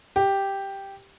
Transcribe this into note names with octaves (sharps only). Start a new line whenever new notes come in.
G4